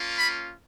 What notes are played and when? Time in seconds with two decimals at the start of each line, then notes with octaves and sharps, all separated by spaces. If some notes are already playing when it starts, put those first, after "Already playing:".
Already playing: A#3 C#4 F4
0.18 B5